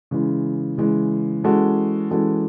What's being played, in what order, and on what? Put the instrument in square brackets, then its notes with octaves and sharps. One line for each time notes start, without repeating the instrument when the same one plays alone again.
[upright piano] C#3 E3 G#3
C#3 E3 G#3
E3 G#3 C#4 F#4 A4
E3 G#3 C#4 F#4 A4